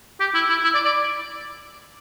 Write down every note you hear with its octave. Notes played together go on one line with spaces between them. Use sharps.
G4
E4
E4
E4
D5
D5